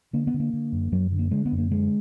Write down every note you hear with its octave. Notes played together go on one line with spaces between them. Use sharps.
D3 A#3
B3
D3
A#3
D3
F#2
F#2 F#3
D3
A#3
D3 G#3
B3
F#2
A#3
D3 G#3